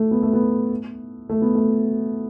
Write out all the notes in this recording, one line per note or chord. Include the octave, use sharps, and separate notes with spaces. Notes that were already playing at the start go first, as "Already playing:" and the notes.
Already playing: A3
B3
A3
B3
A3
B3
A3